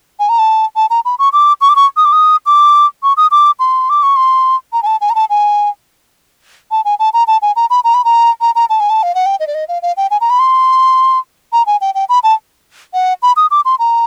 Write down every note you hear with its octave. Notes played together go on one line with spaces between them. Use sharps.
G#5
A#5
A5
A5
A#5
B5
C#6
D6
C#6
D6
C#6
D#6
D6
D#6
D6
C#6
D#6
D6
C6
D6
C#6
C6
A#5
G#5
A5
G#5
A#5
A5
G#5
A5
G#5
A5
A#5
A5
G#5
A#5
B5
A#5
B5
A#5
A#5
A#5
A5
G#5
A5
F5
F#5
G5
D#5
D5
D#5
F5
F5
G5
G#5
A#5
B5
C6
A#5
G#5
G5
G5
B5
A5
F#5
B5
D#6
D6
C6
A#5